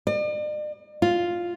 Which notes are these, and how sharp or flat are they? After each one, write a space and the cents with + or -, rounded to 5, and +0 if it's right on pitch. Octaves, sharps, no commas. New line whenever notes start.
D5 +45
F4 +0